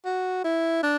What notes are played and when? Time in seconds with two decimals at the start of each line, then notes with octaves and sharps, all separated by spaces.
0.05 F#4
0.44 E4
0.83 D4